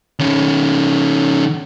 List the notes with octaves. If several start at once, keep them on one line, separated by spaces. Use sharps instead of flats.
D#3 C#4